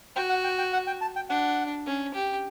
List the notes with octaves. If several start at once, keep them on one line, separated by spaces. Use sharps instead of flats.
F#4 G5
F#5
G5
G5
F#5
G5
A5
G5
D4 F#5
C#4
G4